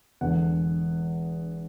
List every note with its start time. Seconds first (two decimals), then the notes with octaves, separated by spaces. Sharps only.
0.21 E1 E2 D3 F#5